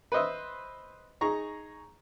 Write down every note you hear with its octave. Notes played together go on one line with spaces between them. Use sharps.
B4 C5 D#5 E5
D#4 G#4 A#5 C#6